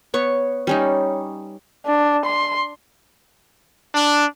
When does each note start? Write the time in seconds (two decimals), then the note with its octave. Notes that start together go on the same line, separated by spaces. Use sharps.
0.14 B3 C#5 C#6
0.67 G3 C#4 D#4
1.86 D4
2.26 C6
3.93 D4